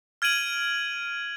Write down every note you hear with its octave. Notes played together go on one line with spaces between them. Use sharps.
F6 G#6 D7 D#7 F#7